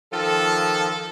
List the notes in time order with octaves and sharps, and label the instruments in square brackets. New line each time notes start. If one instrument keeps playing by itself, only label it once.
[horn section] D#3 F3 F4 A4